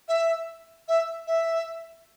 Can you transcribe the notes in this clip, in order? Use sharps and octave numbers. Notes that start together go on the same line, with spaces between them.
E5
E5
E5